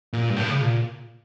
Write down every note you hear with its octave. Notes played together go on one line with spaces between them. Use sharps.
A#2
G2
A2
C#3
A#2